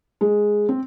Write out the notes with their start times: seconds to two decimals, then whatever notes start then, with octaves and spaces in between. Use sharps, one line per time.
0.21 G#3
0.69 C4